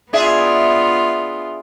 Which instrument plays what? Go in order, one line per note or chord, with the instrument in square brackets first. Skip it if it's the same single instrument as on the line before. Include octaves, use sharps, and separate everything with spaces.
[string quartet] B3 F4 [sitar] D4 G#4 E5